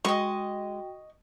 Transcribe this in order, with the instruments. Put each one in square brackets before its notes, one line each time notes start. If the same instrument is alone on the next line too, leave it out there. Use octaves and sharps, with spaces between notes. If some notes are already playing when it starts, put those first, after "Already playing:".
[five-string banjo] G#3 [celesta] F#4 G5 [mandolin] D#5 C#6